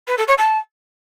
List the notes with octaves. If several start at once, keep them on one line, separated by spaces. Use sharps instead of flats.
B4
A4
C#5
A5